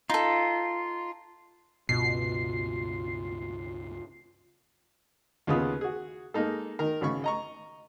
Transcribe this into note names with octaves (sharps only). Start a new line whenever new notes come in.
D#4 F4 A4
C#2 G2 B2 B3 F4 C7
D#2 C#3 B3 F4 D#6
F#4 G#4
G#3 A#3 D#4 A4
D#3 A#4
G#1 C#3 B5 C#6
D#5 A#5 C#6